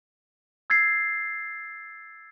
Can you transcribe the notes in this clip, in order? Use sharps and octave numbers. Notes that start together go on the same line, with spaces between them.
E6 G#6 A6 C7